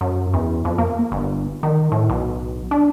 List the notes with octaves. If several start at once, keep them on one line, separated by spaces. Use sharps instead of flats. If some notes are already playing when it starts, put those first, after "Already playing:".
F#2
E2
F2
A#3
G1
D#3
A2
B1
D4